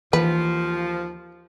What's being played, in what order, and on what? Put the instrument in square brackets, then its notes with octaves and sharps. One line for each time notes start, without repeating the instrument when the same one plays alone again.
[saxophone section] D#2 F3 [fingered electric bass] E3 A#3 [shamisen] B4